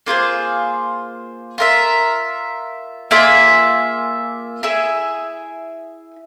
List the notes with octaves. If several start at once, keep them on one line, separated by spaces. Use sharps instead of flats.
A#3 F4 G#4 C5
F4 A#4 E5
A#3 F4 G#4 E5
E4 G#4 E5